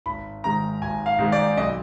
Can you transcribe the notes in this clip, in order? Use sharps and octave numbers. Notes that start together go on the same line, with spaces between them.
G#1 B5
G#2 D#3 G#3 A#5
G#1 G#5
F5
G#2 D#3 G#3
D5
B1 D#5